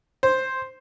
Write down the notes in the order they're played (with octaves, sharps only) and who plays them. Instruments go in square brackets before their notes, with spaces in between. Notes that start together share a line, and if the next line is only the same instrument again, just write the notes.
[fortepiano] C5